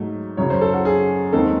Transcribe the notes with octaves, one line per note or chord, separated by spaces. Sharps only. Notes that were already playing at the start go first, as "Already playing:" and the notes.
Already playing: G#2 F#3 A3
F#2 C#3 F#3 C#5
C5
A4
F#4
G#4
D#2 D#3 G#3 C4 A4